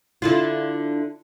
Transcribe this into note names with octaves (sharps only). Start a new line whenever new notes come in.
D3 E4 F4